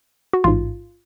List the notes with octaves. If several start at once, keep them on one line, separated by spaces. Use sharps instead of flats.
F#4
A1 G#2 F4